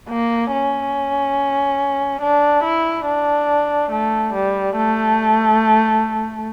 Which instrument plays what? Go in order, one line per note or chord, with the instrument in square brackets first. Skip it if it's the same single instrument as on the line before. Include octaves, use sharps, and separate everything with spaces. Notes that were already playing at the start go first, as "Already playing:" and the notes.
[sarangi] A#3
C#4
D4
E4
D4
A3
G3
A3